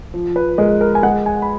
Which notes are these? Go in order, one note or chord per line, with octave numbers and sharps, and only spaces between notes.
F3
B4
G#3 A#4
A#4
G#5
G#3 F#5
G#5
B5